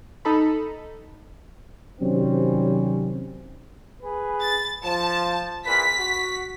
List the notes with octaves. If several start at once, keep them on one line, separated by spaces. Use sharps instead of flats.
D#4 A4 B5
C3 D#3 F#3 G3 C4 C#4
G#4 B4
A6
F3 A5
E2 A#2 B4 B6
F#4